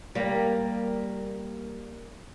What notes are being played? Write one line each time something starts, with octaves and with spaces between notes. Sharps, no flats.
G3 A#3